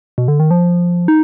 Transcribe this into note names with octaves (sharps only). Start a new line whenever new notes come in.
B2
D3
D#3
F3
D#4